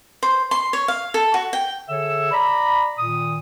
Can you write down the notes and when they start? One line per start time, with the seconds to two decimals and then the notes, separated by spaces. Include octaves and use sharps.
0.23 C5
0.51 C6
0.73 C#5
0.88 F5
1.14 A4
1.34 F#4
1.53 G5
1.89 D3 G#4 A4 C#5 E5 E6
2.32 D5 A#5 B5
2.98 A#2 D#3 D#6